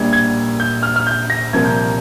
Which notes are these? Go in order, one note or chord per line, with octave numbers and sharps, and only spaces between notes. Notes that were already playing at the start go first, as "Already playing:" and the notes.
Already playing: A#1 A#2 G3 G#6
G#6
G6
F6
F6
G6
A#6
C2 A#2 F3 A#3 G#6
G6
G6